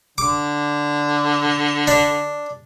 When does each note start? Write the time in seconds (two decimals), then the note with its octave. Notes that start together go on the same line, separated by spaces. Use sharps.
0.18 D3 D6
1.87 D4